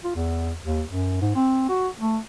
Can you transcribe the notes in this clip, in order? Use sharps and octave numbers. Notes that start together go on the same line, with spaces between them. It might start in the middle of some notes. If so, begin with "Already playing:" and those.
F4
E2
D#2
F#2
G#2
C4
F#4
A3